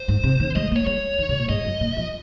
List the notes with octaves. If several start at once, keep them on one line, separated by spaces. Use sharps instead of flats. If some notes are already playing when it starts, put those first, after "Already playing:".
Already playing: C5
G#2
C3
D#3
G#3 D#5
A#3
C#5
G#3 C#5
D#3
C3
A#2
G#2 D#5
F#2
A#2
F3